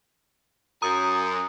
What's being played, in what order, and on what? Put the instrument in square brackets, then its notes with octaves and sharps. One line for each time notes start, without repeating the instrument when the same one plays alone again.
[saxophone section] F#2 [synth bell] A#5 D#6